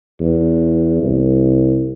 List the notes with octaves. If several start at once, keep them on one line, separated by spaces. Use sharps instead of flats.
E2
C2